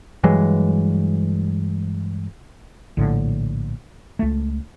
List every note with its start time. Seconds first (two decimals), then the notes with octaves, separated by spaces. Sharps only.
0.24 G2 E3 F#3 G#3
2.97 A#1 A2 D3
4.19 C#2 A3